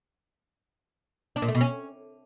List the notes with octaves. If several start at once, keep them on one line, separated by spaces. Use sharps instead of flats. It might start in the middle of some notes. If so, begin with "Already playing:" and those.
D4
A#2
A3
B2
C#4